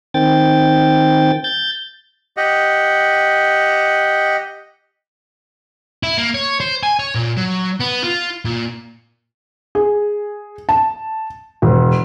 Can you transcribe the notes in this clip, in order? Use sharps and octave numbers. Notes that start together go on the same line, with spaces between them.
D#3 C4 G5 A6
G6 A6
G4 D#5 F#5
E4
A#3
C#5
C5
G#5
C#5
A#2
F#3
B3
F4
A#2
G#4
A5
E1